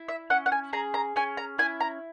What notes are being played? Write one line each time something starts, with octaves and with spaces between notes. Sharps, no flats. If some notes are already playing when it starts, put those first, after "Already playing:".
Already playing: E4
E5
C#4 F#5
F#5
G#5
G#4 A#5
A#5
C#4 G#5
A#5
E4 G#5
A#5